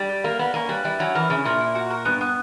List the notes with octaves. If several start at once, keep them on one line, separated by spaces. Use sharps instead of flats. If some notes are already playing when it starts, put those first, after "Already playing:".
Already playing: G3
G4
A#3 A#4
B3 D5
A#3 C#4
G3 B4
G3 E4
F#3 C#4
E3 A#4
C#3 E4
A#2 A#4
E4
F#4
A#4
G2 B3
B3